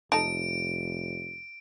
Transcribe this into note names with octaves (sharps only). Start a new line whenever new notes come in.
F1 D#4 A4 D7